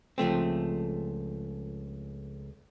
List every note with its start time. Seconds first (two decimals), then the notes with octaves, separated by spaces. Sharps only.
0.18 C#2 F3 A3 C4